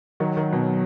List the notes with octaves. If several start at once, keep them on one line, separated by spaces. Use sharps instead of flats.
D#3 F#3
D#3
B2